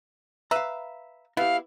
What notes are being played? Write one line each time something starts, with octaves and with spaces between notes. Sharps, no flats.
B4 E5 F5 A#5
B3 E4 G4 F5